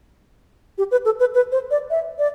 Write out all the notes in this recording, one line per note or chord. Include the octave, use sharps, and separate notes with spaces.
G4
B4
A4
B4
B4
C5
D5
E5
D5